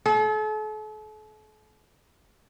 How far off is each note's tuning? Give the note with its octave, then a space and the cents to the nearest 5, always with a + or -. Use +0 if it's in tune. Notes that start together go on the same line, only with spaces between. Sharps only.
A4 -40